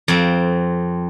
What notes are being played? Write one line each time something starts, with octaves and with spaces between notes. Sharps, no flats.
F2 C4